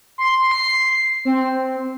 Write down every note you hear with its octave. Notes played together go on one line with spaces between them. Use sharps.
C6
C7
C4